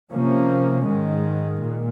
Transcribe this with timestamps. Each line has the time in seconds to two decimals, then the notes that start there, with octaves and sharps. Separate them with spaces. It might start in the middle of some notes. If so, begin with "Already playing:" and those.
0.11 C3 F3 A#3 C#4
0.86 G#2 D#3 G#3
1.61 A#2